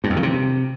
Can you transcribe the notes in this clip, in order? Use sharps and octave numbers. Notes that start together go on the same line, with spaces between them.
G2
F2
D#3
C3